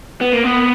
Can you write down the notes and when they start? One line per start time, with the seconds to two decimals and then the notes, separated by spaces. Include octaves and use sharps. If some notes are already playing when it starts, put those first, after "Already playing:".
0.21 B3
0.33 A#3
0.44 B3